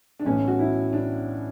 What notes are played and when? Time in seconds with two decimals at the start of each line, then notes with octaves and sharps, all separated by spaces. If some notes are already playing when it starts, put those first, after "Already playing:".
0.20 D4
0.25 B1 A2 E3 C#4
0.48 F#4
0.59 E4
0.93 D4